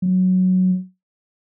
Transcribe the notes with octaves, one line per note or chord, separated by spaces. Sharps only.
F#3